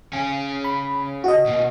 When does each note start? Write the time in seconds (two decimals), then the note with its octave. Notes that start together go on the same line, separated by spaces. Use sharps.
0.13 C#3 C#4 G#5
0.64 B5
1.24 F#4 D#5
1.46 B2 A#3